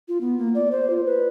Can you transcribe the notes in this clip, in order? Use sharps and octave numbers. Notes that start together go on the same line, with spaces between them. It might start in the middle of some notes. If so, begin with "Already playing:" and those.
F4
B3
A#3
D5
C5
F4
B4